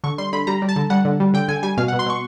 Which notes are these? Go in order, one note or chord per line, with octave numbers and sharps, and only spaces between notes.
D3 C#6
G3 C6
D3 B5
G3 A#5
G3
A5
D3
G3 F#5
D3
G3
D3 G5
D3 G#5
G3 G#5
B2 F5
F#5
B2
C6
B2 C#6